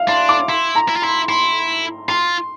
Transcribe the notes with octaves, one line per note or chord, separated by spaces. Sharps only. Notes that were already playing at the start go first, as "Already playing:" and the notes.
Already playing: E5 F5
D4 C6
D6
E4 C6
A#5
E4
F4
E4 C6
E4 C6
F4 C6